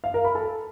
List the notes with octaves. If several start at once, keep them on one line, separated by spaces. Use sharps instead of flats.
F5
A#4
B5
A4